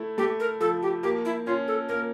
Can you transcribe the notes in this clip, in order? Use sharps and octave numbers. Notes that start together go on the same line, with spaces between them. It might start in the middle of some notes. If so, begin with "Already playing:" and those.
Already playing: A3 E4
A3 G4
A#4
F3 A4
G4
A#3 G4
E4
C#4 F4
A4
A#3 A#4